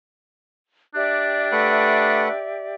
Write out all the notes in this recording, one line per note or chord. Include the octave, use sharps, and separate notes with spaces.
D4 G4 D5 E5
A3 B4 F#5